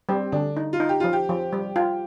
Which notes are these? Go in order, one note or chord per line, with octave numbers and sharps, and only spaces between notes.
G3 C4
D3 D4
D#4
F4
D#4
G4
F3 F4
G4
F3
G3
F4